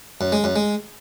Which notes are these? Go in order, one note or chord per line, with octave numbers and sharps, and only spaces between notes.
F#2
G#3
F#2
G#3